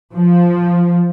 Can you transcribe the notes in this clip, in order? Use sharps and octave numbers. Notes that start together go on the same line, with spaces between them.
F3